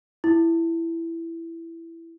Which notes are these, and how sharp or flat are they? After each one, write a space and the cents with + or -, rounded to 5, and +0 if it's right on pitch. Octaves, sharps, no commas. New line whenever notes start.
E4 +10